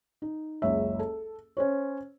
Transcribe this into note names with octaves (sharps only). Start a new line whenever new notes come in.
D#4
F#1 C#2 C#5 E5
A4
C#4 C5 C#5